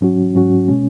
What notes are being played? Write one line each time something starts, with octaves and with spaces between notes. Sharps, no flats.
G#2 F#3 C#4 F#4
G#2 F#3 C#4 F#4
B2 G#3 C#4